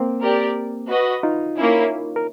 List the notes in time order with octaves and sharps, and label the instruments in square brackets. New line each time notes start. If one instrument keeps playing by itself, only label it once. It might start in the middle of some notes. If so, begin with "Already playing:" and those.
Already playing: [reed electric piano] A#3 C4
[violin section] G4 A#4 D5
F#4 B4 D#5
[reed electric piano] D#4 F4
[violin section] A#3 C#4 E4
[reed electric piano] A#4